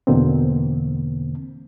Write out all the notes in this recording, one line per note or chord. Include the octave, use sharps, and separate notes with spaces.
E2 B2 D3 A#3 C4